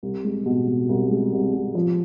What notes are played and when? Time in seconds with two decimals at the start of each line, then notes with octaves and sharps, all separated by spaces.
0.03 C2
0.24 G#3
0.46 B2
0.68 B2
0.89 C2
1.11 G#3
1.32 C2
1.53 C2
1.75 F3